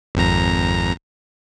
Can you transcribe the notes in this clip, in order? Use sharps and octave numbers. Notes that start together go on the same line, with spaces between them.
G#1 F2 A#5